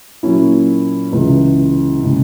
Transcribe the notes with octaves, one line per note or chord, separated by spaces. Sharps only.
A#2 F#3 A#3 C#4 E4
C#2 C#3 E3
C#3 G#3